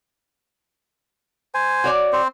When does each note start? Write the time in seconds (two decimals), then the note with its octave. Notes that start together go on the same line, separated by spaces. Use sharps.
1.54 C5 G#5
1.84 F#4 C#5 D5
2.13 C4 C5